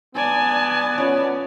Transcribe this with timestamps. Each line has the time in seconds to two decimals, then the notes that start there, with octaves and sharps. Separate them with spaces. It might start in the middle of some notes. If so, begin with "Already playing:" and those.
0.15 B3 D5 G#5 A5
0.98 C#4 F4